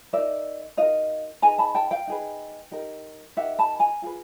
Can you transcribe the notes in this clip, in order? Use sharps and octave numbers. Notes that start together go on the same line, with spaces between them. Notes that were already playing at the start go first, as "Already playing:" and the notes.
D#4 F#4 A#4 D5 E5
D#4 F#4 A#4 D#5 F5
D#4 G#4 B4 G#5 A#5
A5 B5
G5 A5
F5 G5
D#4 G#4 B4
D#4 G4 A#4
D#4 G4 A#4 E5 F#5
A5 B5
G#5 A#5
F4 G#4 B4